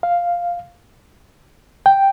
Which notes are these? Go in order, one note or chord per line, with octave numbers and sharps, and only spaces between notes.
F5
G5